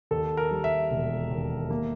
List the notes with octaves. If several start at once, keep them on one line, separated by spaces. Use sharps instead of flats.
D#2 A4
A#4
G3
E5
E1
D#2
A#3